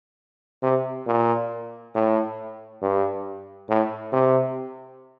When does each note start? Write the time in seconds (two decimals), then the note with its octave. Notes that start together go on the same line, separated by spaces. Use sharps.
0.63 C3
1.07 A#2
1.95 A2
2.82 G2
3.69 A2
4.13 C3